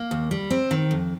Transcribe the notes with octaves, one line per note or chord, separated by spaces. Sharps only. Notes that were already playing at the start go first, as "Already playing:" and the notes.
Already playing: A#3
D#2
G3
C4
D#3
F2